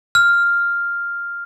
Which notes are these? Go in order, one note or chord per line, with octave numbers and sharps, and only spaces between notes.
F6